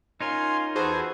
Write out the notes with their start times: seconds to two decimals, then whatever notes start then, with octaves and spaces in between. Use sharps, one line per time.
0.21 C#4 D#4 F4 A#4 F5 G#5 C6
0.75 E2 F#4 G#4 A4 B4 C5 G#5 C6